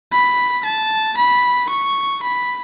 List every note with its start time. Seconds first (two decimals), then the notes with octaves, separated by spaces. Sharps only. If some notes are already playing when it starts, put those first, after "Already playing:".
0.12 B5
0.65 A5
1.17 B5
1.70 C#6
2.23 B5